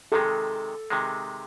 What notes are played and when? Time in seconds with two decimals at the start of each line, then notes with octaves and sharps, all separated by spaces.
0.12 C3 D#3 G#3 A4
0.90 C3 D#3 G#3